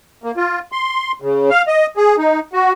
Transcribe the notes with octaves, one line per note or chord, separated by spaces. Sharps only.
A#3
F4
C6
C#3
F5
D#5
G#4
D#4
F#4